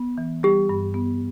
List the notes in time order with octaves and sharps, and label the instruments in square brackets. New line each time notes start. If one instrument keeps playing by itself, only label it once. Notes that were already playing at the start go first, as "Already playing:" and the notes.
Already playing: [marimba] B3
E3
[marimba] G3 [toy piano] G4
[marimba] G2
B3